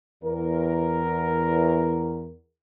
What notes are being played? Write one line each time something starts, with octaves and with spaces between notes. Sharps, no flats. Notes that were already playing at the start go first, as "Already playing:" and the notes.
E2 A#4